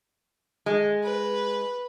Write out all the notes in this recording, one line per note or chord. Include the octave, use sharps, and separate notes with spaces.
G#3
B4